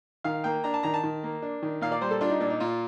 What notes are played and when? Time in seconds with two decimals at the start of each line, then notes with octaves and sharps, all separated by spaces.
0.24 D#3 F5
0.44 A#3 G5
0.64 D4 A#5
0.74 A5
0.83 D#3 A#5
0.94 A5
1.04 D#3
1.23 A#3
1.42 D4
1.63 D#3
1.81 A#2 F5
1.92 D5
2.01 G3 C5
2.11 A4
2.21 D4 F4
2.30 D#4
2.40 A#2 D4
2.50 D#4
2.60 A#2 F4